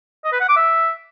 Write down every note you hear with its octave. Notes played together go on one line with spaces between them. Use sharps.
D#5
B4
F#5
D6
E5